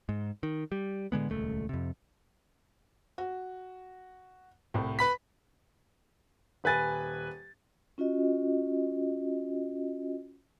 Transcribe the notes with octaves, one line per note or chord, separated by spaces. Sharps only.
G#2
D#3
G3
A2 D3 G#3 B3
D#1 C#2 A3
F2 C3
F#4
C2 A2
B4 B5 B6
D#1 B4 G#5 A6
C#4 F4 F#4 D#5